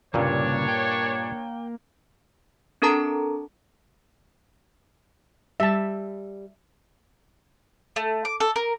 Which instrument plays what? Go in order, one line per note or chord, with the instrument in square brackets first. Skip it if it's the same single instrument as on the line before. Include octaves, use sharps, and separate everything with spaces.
[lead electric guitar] C2 C#3 [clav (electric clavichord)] G2 A#2 [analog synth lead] A#3 [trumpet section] D4 C#5
[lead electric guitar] G5
[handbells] C4 D4 A4 A#4 A5 A#5
[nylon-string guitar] G3 [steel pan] E5 A5
[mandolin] A3
D6
A4
A#4